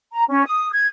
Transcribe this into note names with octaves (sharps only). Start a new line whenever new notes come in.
A#5
C#4
D#6
G#6